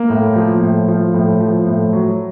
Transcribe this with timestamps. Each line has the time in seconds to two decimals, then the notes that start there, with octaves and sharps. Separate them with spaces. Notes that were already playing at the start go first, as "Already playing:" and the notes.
Already playing: A#3
0.10 A2
0.36 F3
0.62 A2
0.88 F3
1.14 A2
1.41 F3
1.66 A2
1.93 F#3